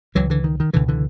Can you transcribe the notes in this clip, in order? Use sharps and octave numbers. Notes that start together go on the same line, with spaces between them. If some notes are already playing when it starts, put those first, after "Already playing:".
C#2 C#3 E3 F#3
D3 E3
D#3
D#3
C#2 B2 D3 E3
D3 E3